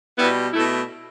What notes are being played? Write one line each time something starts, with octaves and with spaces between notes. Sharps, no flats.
B2 G3 B3 E4
B2 A3 E4 A4